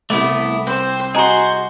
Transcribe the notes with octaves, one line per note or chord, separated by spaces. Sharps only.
C2 A3 B3 E4 D5
C4 C5
F#4 G#4 C5 D#5 G#5 A#5